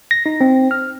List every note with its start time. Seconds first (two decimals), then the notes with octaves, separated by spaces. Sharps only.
0.11 A#6
0.26 D#4
0.41 C4
0.71 F6